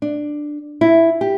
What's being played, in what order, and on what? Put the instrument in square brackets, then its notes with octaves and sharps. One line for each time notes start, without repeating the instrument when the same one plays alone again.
[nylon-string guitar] D4
E4
G4